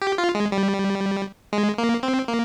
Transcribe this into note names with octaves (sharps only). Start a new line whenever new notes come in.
G4
F4
G#3
G3
G#3
A#3
C4
A#3